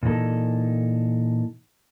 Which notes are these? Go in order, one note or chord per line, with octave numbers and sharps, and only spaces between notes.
A#2 E3 D#4 A4